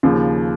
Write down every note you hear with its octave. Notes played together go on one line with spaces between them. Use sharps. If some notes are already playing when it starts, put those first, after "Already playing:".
D#2 C#3 F3